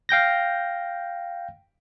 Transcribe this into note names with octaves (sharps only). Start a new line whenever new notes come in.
F5 G5 G6 A#6